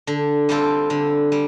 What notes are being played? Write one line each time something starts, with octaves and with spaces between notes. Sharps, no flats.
D3
G3 C4 F4 A4
D3
G3